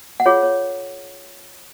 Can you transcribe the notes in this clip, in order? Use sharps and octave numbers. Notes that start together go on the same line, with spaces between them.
F#5
F4 G#4 C#5 F5
C#5